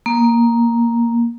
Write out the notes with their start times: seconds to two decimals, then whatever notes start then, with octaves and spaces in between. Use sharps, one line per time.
0.06 A#3